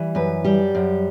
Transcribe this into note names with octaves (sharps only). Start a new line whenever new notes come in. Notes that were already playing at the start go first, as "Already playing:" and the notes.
Already playing: E3 G3
F#2 B4
G3 G4
F#2